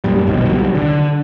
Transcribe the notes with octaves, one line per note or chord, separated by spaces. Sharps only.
F#2 A#2 G3
A#1 G2 B2 D#3
D#1 C2 F#3 G3
D3